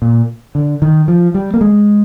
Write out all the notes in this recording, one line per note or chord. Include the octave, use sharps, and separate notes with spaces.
A#2
D3
D#3
F3
G3
A#3
G#3